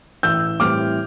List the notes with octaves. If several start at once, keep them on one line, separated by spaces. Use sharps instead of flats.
A1 E6 G6
A2 E3 G3 C4 D6 F6